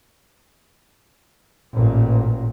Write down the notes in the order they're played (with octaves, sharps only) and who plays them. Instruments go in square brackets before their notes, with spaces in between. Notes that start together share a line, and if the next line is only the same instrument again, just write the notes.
[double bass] A1 A#2